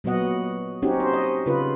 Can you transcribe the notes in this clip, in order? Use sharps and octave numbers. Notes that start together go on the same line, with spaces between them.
A#2 F#3 B3 F#4 D#5 F#5
C4 C#4 D#4 F#4 G4 C#5
C5
D#5
C#3 F4 B4